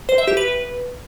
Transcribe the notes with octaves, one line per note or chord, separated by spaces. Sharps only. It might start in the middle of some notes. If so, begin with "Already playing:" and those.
C5
E5
G4
B4